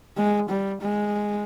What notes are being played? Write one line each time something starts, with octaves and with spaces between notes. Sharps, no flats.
G#3
G3
G#3